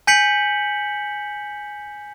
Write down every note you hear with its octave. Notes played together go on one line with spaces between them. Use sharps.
G#5 G6 B6 C#7 F#7